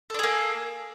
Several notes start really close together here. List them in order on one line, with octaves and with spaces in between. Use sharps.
A4 D4 G#4 A#3